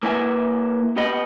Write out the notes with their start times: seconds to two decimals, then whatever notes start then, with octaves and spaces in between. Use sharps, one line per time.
0.03 A#3 E4 B4 E5 G#5
0.97 B3 G4 D#5 B5